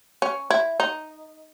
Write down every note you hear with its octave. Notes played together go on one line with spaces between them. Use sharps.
C#4
E4
D#4